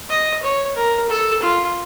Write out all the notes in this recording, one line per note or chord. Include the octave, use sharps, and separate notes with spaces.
D#5
C#5
A#4
A4
F4